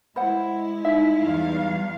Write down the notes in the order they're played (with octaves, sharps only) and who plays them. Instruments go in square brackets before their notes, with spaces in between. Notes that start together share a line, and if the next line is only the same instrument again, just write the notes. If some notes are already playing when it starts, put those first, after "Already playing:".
[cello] G#3 E4 [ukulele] C5 F#5 [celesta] B5
[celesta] D#4 B6 [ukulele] E5
[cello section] E2 G3 F5